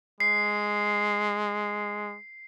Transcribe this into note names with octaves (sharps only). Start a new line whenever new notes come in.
G#3 C7